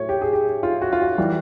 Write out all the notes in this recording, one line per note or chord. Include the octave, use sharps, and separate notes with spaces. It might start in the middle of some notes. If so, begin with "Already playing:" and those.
Already playing: A2 F#3 C#5
G4
G#4
G4
F4
F#4
F4
F#4
E3 G3